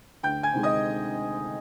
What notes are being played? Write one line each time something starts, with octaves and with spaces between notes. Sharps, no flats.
D2 G5 G6
G#5 G#6
C3 D#3 G#3
D#5 D#6